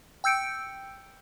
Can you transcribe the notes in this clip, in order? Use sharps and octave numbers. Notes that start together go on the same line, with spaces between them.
G5 E6 G6 C#7 D7